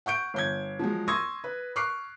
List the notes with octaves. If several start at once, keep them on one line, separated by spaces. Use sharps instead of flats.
F#5 C#6 G6 D7
G1 G6 G#6
F3 F#3 G#3
C6 C#6 D#6 E6 G#6 A#6
B4
C#6 D6 F6 F#6 C7